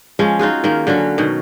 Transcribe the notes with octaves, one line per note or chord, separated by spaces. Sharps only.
F3 G#3 C#4
D#4 F4 F#4 G#4
D#3 A#3
D3 F#3 C#4 F#4
B2 D#3